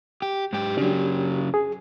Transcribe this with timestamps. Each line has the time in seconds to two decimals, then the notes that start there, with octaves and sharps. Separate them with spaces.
0.22 G4
0.53 G#2 G4
0.77 C#3 F#3 D4 G4
1.54 G#4